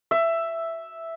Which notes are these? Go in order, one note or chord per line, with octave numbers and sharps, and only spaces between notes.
E5